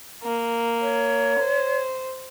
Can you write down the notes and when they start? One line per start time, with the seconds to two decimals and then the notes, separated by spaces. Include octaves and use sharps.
0.23 A#3
0.81 C#5
1.40 C5